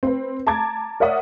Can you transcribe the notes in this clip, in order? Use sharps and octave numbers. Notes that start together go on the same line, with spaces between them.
C4 B4
A5 A#5 D6 G#6 A6
A#4 C#5 D5 E5 F#5 D#6